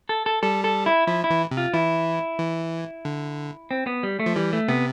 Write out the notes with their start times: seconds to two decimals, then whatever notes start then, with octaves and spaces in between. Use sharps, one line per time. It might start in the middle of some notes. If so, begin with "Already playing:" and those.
0.09 A4
0.26 A4
0.43 G3 A4
0.64 A4
0.86 E4
1.07 F3 E4
1.24 E4
1.30 E3
1.51 C3
1.57 F4
1.73 E3 E4
2.39 E3
3.05 D3
3.71 C4
3.87 B3
4.03 G3
4.20 A3
4.26 F3
4.35 E3 G3
4.53 A3
4.68 C3 B3